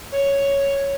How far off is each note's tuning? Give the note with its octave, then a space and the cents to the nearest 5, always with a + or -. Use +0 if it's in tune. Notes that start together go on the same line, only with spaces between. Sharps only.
C#5 +0